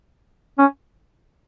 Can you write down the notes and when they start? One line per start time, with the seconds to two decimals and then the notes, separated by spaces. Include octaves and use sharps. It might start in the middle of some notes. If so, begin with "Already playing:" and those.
0.58 C#4